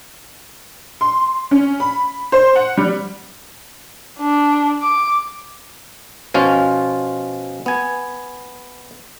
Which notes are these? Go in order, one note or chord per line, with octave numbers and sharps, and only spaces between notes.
C6
C#4
B5
C5
F#5
G3
D4
D6
B2 F3 C#4 F4
B3 G#5